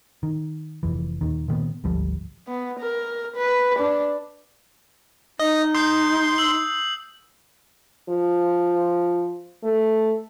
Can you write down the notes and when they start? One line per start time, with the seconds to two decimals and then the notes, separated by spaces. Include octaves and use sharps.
0.23 D#3
0.83 F1 F2 E3
1.21 D#1 D#2 D#3
1.48 A#2 D#3 A3 B3
1.84 G#1 D2 F3 G3
2.48 B3
2.80 A#4
3.36 B4
3.79 D4
5.39 D#4 D#5
5.75 C6 D#6 G6 C7
6.38 E6 F#7
8.09 F3
9.64 A3